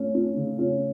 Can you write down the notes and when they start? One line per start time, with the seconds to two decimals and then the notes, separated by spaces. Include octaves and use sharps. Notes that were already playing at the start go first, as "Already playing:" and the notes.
Already playing: A3 C#4
0.15 C#4
0.37 C#3
0.59 C#4